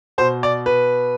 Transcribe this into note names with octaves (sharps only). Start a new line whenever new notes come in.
B2 C5
D5
B4